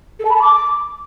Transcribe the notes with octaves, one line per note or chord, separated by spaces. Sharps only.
A4
A5
B5
A5
D6